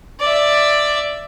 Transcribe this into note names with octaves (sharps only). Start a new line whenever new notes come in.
D5 E5